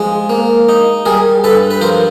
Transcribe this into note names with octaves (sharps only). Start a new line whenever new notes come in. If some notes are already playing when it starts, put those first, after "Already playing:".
Already playing: F3 G#3
A#3
D#4
G3 G#4 A#4
G2 A4 B4
B4
F3 A#4 C5